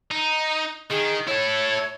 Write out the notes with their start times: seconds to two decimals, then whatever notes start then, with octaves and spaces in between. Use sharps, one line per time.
0.11 D#4
0.90 D#3 G#4
1.27 E4 A4 C#5